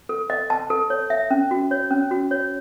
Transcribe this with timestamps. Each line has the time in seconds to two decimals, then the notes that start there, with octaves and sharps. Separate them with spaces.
0.09 A4
0.30 D#5
0.50 A5
0.70 A4
0.90 C#5
1.10 E5
1.30 C#4
1.51 F#4
1.71 C#5
1.90 C#4
2.11 F#4
2.31 C#5